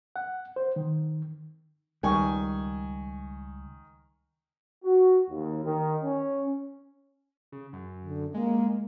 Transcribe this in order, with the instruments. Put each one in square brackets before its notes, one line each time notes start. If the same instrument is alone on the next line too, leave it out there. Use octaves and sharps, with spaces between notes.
[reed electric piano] F#5
C5
D#3
[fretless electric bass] C#2 G3 [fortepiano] D#3 G#5 C#6
[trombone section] F#4
D#2
D#3
C#4
[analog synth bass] C#3
F#2
[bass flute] D3
[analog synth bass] G#3 [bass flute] A#3